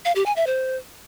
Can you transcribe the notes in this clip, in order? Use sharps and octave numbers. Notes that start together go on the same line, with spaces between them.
F5
G4
G#5
E5
C5